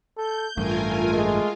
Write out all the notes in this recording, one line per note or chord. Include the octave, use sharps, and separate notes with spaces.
A4 G6
A1 G2 A3 F4 A#4 G#5
G#3 F4